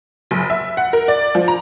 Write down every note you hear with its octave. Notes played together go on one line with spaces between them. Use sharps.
F#1
E5
F#5
A#4
D5
F3
A#5